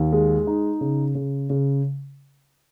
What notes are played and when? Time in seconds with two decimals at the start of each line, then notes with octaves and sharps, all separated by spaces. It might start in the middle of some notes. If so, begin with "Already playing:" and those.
Already playing: D#2
0.13 G#3
0.47 D#4
0.81 C#3
1.15 C#3
1.50 C#3